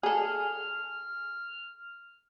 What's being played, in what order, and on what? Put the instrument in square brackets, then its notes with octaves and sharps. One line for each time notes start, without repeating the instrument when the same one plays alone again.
[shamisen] G#4 A4 [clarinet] F6